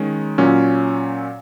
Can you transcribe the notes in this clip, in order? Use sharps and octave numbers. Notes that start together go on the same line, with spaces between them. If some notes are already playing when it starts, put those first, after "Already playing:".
Already playing: D#3 G#3 C#4
A#2 F#3 C#4